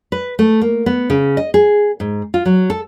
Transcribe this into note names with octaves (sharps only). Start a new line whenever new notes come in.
B4
A3
A#3
B3
C#3
D#5
G#4
G#2
F4
F#3
A4